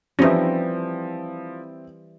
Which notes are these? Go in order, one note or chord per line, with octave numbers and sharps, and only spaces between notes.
E3 F3 G3 C4 C#4 D#4 E4 A#6